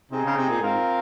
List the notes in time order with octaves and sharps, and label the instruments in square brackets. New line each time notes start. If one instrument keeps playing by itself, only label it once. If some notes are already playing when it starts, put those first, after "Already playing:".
[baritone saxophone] C3 [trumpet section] C4 D#4 G#4
[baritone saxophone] C#3
C3
A#2
[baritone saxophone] G#2 [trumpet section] C4 F4 A#4 F5